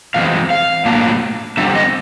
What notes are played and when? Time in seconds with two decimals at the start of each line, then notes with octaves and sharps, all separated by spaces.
0.14 A2 E3 G#3 C4 F5
0.50 F5
0.85 A2 F#3 A#3 D4
1.57 D3 G3 C4 E5
1.75 D#5